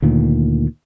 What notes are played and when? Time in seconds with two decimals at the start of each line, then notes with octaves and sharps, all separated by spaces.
0.02 D2 A#2 D#3